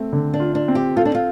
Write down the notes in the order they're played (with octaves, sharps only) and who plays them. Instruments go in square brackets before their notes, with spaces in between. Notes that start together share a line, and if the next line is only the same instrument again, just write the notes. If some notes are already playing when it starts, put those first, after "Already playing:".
Already playing: [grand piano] A3 C4
D3
[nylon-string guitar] D4
[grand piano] F4
[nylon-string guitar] D4
[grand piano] C4
[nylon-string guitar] G4
[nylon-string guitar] F4 [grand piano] A4
[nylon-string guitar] D4
F4